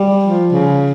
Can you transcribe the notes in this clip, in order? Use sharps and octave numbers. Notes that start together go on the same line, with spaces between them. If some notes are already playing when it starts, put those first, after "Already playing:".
Already playing: G3
F3
C#3